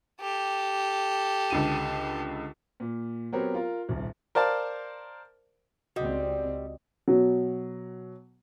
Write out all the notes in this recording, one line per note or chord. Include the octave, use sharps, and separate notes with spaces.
G4 A4
C#2 D3 D#7
A#2
F#3 B3 C4 G4 A#4 C#5
F4 A#4
D#1 C2
A#4 C5 D5 F5 A5
C#2 G3 C4 F#4 D#5
B2 F#3